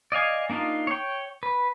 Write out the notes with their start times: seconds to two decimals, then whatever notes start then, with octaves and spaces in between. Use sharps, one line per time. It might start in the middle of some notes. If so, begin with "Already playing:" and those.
0.12 D5 D#5 F5 G#5
0.50 A#3 D4 D#4 F4
0.87 C#5 G5
1.43 B4